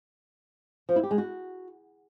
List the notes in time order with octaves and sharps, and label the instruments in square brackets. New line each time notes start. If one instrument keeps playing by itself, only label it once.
[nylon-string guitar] F3
E4
G4
G#3
F#4